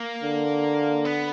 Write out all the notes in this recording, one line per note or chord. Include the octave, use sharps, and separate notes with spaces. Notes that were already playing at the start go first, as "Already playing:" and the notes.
Already playing: A#3
D3
B3